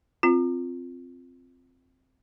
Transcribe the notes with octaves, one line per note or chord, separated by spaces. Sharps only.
C4 F4